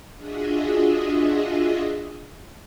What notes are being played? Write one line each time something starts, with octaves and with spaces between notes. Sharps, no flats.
D4 F4 F#4 G#4 D#5 E5